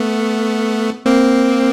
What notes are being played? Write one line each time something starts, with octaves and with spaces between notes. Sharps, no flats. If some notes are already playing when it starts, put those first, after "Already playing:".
Already playing: A3 B3
A#3 C4